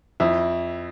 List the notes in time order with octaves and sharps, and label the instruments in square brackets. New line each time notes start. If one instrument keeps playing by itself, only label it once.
[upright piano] F2 E4